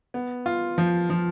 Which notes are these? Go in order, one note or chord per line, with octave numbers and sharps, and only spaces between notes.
B3
F4
F3
F3